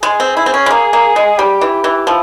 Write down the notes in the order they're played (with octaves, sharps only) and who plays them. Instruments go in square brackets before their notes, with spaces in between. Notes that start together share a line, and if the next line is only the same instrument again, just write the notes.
[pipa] G#3 [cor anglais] G#4
[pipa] C4
E4
C4
C#4
G#3
A#3
A#3
G#3
[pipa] G3 [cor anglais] G4
[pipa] E3
E3
[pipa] F3 [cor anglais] E4